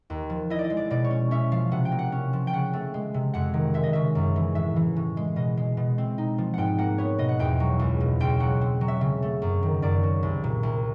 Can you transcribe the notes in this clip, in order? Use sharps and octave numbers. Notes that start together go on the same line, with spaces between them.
D#2
F3
E4 D#5
D5
D#5
G#3
D5
B2 D5
C#5
C#4
C#4 E5
F3 F5
C3 F#5
G5
A#3
F#5
C#4
F3
G5
C#3 F#5
A3
G#3
C3
F2 F#5
D#3
G#3 E5
D#5
C#3 E5
F#2
E3
A2 E5
E3
A2
G#3
B2 D#5
G#3
B2
C4
D#4
F3
G#2 F#5 G5
A#3 F#5
B3 C#5
B2 D#5
F#5
E2 G5
F#3
C#2
B2
C#2 G5
F#3 F#5
C4
F#3
E5
C#3
A3
F#2
D#3
F#2 D5
F#3
C2
A#2
C2